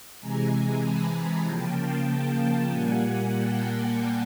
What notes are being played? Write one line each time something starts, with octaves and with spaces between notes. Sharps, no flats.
C3 E3 G#3 G#5 A#5
A5 B5
C#3 F3 A#3 G5 A5
G5 A5
A#2 G3 A#3 F#5 G#5
G5 A5